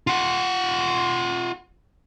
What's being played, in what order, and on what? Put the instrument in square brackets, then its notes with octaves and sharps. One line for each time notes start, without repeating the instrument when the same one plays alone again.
[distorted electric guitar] F4 F#5